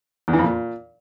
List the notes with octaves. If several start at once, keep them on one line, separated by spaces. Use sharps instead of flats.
E2
E3
F2
A#2